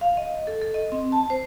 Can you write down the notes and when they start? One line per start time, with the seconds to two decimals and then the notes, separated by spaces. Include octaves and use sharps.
0.01 F5
0.17 D#5
0.47 A4
0.62 A4
0.74 D#5
0.92 C4
1.12 A5
1.30 C5